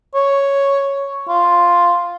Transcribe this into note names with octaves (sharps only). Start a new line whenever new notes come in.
C#5
F4